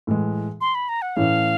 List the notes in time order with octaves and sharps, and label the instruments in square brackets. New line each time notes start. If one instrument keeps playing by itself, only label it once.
[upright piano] A2 E3 G#3
[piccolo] C6
B5
A#5
F#5
[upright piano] A2 E3 A3 C#4 [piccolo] F5